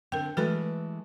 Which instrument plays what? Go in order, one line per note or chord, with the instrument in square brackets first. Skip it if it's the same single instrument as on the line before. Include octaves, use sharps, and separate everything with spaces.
[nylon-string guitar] D3 C4 [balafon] A#4 G5
[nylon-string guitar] E3 G#3 A3 [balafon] F#4 A4 B4